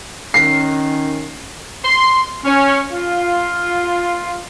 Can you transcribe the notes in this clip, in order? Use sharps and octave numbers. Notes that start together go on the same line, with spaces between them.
D#3 C#4 C7
C6
C#4
F4